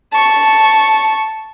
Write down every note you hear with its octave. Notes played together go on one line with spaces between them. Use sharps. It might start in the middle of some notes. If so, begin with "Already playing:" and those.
A5 C#6